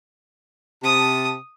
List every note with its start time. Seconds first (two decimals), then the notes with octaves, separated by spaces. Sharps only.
0.84 C3 A5 D#6